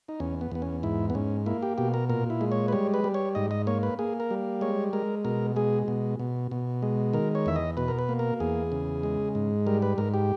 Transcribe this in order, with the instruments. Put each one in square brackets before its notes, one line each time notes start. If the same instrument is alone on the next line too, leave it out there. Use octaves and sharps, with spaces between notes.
[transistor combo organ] D#4
E2 C#4
B3
E2 B3
C#4
G#2 E4
B3
G#2 C#4
A#3 E4
G4
B2 G4
A#4
A#2 A#4
E4
G#3
C#5
B4
G3 C#5
B4
G3
C#5
G#2 D#5
D#5
A#3 C#5
B4
A#3 G#4
A#4
G3
G#3 C#5
G#3 A#4
B2 A#4
G#3 G#4
B2
B2
B2
G#3
D#3 A#4
C#5
E2 E5
D#5
B2 B4
A#4
B4
A#3
A#4
E2 G#4
C#3
G#3
G#2
G3 A#4
B4
G#2 A#4
G4